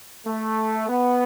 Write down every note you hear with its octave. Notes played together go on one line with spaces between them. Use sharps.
A3
B3